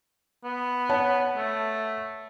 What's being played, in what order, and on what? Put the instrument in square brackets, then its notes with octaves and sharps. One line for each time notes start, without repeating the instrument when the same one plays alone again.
[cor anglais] B3
[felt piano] C#5 F#5 A5
[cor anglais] A3